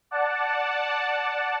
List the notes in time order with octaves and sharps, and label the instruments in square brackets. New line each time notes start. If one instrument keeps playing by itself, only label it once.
[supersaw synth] D5 F#5 A5